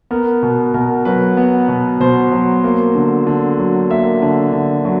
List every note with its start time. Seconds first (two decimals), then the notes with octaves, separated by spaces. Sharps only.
0.11 B3 A#4
0.43 B2
0.74 B2 A#4
1.05 F#3 B4
1.37 B3
1.68 B2
2.00 B2 C5
2.32 F#3
2.64 A#3
2.95 D3
3.27 D3
3.59 F#3
3.90 A#3 E5
4.22 D3
4.53 D3
4.85 F#3